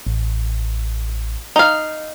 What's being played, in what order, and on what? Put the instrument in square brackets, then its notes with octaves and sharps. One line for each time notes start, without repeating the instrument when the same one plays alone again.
[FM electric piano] A1
[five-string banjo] D#4 F5